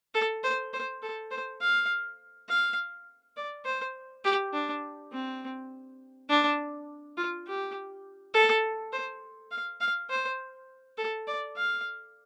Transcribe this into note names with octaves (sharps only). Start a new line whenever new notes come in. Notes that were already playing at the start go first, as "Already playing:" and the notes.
A4
C5
C5
A4
C5
F5
F5
D5
C5
G4
D4
C4
D4
F4
G4
A4
C5
F5
F5
C5
A4
D5
F5